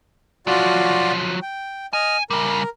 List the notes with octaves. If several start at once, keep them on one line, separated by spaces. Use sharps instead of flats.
F3 F#3 F4 F#4 D5
G5
D#5 G#5 F6
C#3 G3 A#4